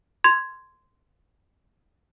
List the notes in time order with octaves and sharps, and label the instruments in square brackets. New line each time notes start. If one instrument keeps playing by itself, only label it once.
[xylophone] C6 G#6